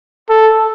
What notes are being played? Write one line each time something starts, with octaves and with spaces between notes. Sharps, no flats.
A4